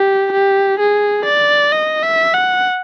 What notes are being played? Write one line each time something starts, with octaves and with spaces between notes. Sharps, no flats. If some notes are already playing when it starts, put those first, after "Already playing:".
Already playing: G4
G4
G#4
D5
D#5
E5
F#5